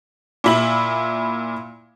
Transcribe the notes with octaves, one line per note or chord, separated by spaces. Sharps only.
A#2 E4 F#7